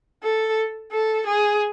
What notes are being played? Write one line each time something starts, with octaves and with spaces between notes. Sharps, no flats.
A4
A4
G#4